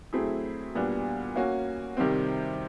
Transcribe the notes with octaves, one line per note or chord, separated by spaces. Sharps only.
F#3 A3 C4 E4 G#4
A#2 G3 B3 D4
A#3 C#4 F#4
C3 D#3 G3 C4